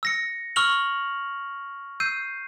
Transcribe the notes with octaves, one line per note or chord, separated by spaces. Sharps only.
E6 A#6 C#7
C#6 E6 F6 F7 F#7
E6 G6 C7 D#7